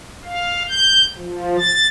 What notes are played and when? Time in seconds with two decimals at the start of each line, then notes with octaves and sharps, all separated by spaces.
0.25 F5
0.69 G6
1.18 F3
1.58 A6